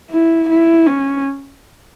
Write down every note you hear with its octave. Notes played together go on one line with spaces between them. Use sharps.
E4
E4
C#4